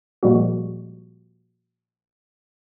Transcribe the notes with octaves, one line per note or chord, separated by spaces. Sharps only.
A#2 F3 G3 G#3 A#3 F#4